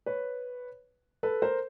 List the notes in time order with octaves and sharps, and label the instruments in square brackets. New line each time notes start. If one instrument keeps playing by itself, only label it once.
[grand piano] B4 C#5
A4 B4
A#4 C5